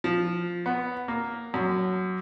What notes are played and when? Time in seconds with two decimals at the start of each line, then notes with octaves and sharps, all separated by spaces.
0.04 F3
0.66 B3
1.08 A#3
1.54 F#2